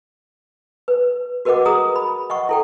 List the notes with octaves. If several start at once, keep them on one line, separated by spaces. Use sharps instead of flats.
B4
F#4 A#4 B4 D#5 F#5 D6
G#4 A#5 D#6
B5
D#5 F#5 C#6
E4 A4 G5